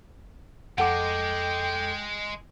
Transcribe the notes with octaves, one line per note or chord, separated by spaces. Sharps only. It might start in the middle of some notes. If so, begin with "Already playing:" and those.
F2 G#3 A4 F#5 G5 D6